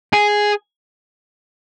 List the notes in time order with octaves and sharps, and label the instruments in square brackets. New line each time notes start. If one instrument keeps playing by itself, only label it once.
[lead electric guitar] G#4